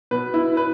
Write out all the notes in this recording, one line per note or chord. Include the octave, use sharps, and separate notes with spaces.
B2 B4
E4
B4